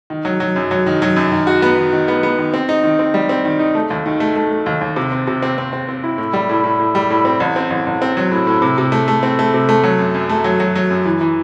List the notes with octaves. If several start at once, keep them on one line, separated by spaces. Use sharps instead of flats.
D#3
F#3
F#3
F#2
F#3
D#3
F#3
F#2
D#3
F#4
B3
D#3
D#3
B3
B3
D#3
C4
D#4
D#3
C4
G3
C4
D#3
D#4
A3
D#2
D#3
A3
A3
A3
D#2
D#2
C3
C4
C3
C4
C4
C4
C4
E4
A2
G3
A2
A2
A2
G3
A2
C4
A1
C4
A1
A1
C4
F#3
A2
A2
C3
C3
A3
A3
C4
A3
C3
A3
F#3
F#2
F#2
A3
F#3
F#3
F#3
F#2
E3
E3